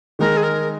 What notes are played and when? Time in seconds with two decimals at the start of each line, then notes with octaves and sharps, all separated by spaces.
0.19 D#3 G#3 D#4 A#4
0.37 G#4
0.43 A#4